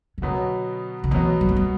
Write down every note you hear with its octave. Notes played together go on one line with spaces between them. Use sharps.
E3
B2 D3 F#3 B3 F#4
D3
B2 E3 F#3 B3 F#4
G3
A#3
G3